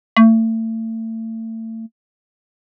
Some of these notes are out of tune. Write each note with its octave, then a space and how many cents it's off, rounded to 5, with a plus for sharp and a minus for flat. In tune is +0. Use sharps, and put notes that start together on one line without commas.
A3 +35